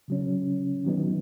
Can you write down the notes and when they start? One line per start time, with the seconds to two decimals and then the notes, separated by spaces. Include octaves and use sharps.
0.08 C#3 F#3 C#4
0.85 D#3 F#3 B3 D#4